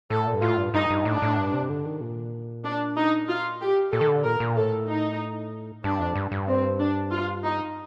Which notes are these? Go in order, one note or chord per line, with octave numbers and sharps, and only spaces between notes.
A2 A4
A#2
G2
A2 F4
G2
G2 D#4
G2
A2 D4
A2
G2
C3
D3
D#3
A#2
D4
D#4
F4
G4
A#2 A4
D#3
D3
A#2 A#4
A#2
A2 A4
D#4
G2 D4
F2
G2
G2
C4
D4
F4
D#4